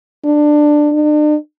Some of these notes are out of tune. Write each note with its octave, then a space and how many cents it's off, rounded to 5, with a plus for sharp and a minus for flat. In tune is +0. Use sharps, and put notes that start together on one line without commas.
D4 +15
D4 +45